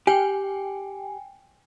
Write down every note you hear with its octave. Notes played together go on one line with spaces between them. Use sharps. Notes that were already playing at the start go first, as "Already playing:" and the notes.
G4 G5 G#5